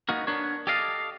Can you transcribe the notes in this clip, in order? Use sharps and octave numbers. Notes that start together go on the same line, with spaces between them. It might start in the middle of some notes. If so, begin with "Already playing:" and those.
A#3 B3 D#4 F#4 A#4
B3 D4 A#4 C#5
G4 A4 D5 D#5 F5